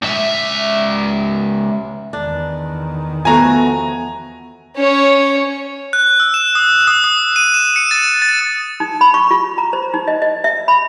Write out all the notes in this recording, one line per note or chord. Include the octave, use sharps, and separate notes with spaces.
C#2 E5
E2 D#3 D4
F3 A3 B3 F#4 G#5 A#5
C#4 C#5
F#6
E6
E7
D#6
D#6
D#6
D#7
E7
C#7
A6
A6
D#4
B5
C#6
F4
A#5
C5
D#4
D#5
D#5
E5
B5